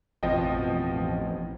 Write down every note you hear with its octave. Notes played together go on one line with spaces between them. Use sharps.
A1 F2 B2 F3 C4 D#5 G5